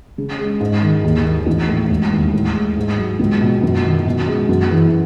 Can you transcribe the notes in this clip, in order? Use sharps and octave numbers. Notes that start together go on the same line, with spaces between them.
C#3
G#3
G#2
D#3
D#2
D#3
A1
A2
E1
D#2
A2
G#3
G#2
F#3
C#2
B2
F#2
D#3
B2
G#3
F#2
E3